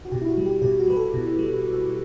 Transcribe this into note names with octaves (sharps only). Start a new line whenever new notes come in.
F#4
B2 G4
E4
F#4
G3
G4
B2 G4
F#4
G3 B4
A4
B2
G3